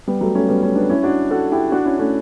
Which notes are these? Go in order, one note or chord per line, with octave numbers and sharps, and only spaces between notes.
G3 B3
F#3 A3
A3 C#4
G3 B3
A3 C#4
B3 D4
C#4 E4
D4 F#4
F#4 A4
E4 G4
D4 F#4
C#4 E4
A3 C#4